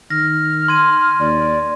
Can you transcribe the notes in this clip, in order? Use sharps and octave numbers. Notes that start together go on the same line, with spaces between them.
D#3 F6 A#6
C6 G#6 D#7
D#2 D5